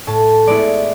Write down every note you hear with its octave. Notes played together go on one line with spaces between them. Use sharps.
A2 A5
G#3 B3 E4 D5